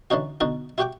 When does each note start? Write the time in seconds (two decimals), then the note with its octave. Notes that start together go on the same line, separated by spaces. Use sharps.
0.10 D3 E3 C#4 D#4 F#4
0.41 B2 D3 D#4 F#4
0.78 E4 F#4 G4 F#5 G5 D6